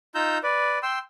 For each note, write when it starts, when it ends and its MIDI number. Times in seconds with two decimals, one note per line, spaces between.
0.15 0.38 63
0.15 0.38 65
0.15 0.38 82
0.15 0.38 88
0.15 0.38 91
0.43 0.79 71
0.43 0.79 74
0.83 0.99 79
0.83 0.99 84
0.83 0.99 88